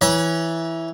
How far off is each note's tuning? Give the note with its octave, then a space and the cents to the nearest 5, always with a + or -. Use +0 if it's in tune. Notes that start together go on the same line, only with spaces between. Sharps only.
E3 +0 C#5 +0 B5 -45